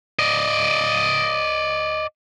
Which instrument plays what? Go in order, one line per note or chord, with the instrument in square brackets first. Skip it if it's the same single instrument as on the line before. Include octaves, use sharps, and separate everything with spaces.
[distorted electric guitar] D5 D#5